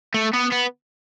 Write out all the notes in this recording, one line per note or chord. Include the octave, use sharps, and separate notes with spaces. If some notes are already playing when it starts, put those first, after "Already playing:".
A3
B3
B3